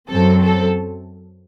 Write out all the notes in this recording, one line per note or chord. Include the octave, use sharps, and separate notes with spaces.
F#2 F#3 C4 A4
A4